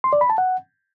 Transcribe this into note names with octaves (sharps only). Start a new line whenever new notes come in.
C6
D5
B5
A5
F#5